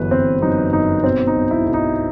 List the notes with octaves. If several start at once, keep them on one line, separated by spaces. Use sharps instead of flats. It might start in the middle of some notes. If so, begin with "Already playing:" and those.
Already playing: G1 F#2 E3 B4
G1 C4
F#2 D#4
G1 D#4
B2 C4
D#4
B1
E4
B1
D#4